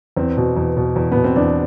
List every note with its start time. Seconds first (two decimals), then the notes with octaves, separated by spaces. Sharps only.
0.17 E2 C4
0.37 B2
0.57 E2
0.77 B2
0.96 E2
1.11 B2 B3
1.24 C4
1.36 E2 D4